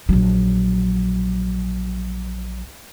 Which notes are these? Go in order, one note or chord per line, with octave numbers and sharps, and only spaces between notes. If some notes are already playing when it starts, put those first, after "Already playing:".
A#1 F#3